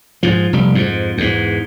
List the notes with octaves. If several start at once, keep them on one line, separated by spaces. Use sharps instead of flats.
G#2 F3
F1 G3
F2 G#2
E2 G#2